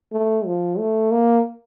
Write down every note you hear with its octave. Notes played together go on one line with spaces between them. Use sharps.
A3
F3
A3
A#3